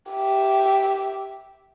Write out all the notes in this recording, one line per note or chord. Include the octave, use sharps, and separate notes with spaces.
G4 E5